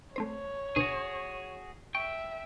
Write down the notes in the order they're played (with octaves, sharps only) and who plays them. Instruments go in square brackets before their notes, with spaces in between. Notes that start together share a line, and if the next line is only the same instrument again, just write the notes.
[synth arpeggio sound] A3 C4 C5 [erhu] C#5
[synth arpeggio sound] D2 B2 C#6 [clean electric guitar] F#4 G#4
[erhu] E5 [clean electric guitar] G5 [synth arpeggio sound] C#6